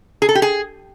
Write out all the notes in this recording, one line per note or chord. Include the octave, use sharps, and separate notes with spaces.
G#4
A4
G4
G#4